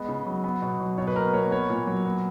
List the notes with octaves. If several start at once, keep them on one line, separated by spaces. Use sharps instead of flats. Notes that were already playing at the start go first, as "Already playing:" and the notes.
Already playing: G#3 B3 D#5
C#3
F#3
B3
B2
F#3
B2 C#5
B4
A#3 A#4
A#3 C#5
B3 C#5
A#2
F#3
B3